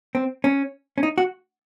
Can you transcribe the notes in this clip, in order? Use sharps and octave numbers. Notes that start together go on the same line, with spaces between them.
C4
C#4
C#4
D#4
F#4